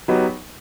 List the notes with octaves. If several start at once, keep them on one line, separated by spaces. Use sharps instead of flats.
F#3 B3 D#4 G4